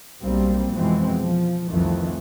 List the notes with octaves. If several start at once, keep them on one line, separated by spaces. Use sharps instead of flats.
B1 G3 A#3 C4
F2 B2 E3 G#3 C4
F3
C2 F2 D#3 E3 A3